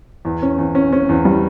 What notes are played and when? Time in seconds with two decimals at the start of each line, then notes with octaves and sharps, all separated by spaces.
0.25 E2
0.42 C#4
0.58 E2
0.75 C#4
0.93 C#4
1.09 E2
1.25 G3